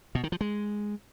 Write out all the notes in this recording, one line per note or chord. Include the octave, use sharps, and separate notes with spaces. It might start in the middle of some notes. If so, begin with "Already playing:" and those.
B2
D#3
F3
G#3